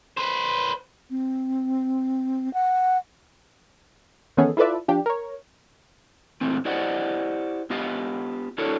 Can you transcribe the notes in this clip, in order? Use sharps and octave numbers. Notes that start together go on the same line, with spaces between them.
B4 C5
C4
F#5
D#3 E3 B3 C#4 G#4 A4
E4 F4 A4 B4 D5 E5
F3 D4 G4
A#4 C#5
A#2 E3 A3 C4
E4 G4 C5 D5 D#5 F#5
B3 F4 G4 D#5 F5
D4 E4 F#4 A4 A#4 C#5